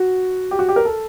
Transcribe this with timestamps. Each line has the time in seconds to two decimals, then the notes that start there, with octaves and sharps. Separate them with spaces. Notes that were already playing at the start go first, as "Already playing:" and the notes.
Already playing: F#4
0.51 G4
0.59 F#4
0.69 G4
0.76 A#4
0.85 A4